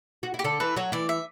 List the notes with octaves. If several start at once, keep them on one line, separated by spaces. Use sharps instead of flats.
F#4
E4
G4
D3 D4 A4
E3 E4 B4
F#3 F#4 C#5
E3 E4 D5
E5